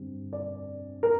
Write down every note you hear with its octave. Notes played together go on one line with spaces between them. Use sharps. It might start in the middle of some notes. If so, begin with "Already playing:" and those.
Already playing: G2 D3 G3 C4
D5
A#4